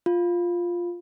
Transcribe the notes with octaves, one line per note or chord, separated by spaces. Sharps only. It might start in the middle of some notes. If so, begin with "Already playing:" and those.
F4